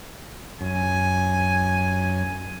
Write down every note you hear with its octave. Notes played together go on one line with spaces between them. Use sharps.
F#2 G#5